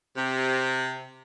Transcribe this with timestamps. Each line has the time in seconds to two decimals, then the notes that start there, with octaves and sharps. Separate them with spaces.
0.15 C3